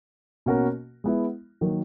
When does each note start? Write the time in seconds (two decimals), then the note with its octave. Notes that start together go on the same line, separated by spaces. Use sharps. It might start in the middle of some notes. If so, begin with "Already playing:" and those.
0.46 B2 A#3 C#4 F#4 A#4
1.04 G#3 B3 E4
1.61 D#3 F#3 A#3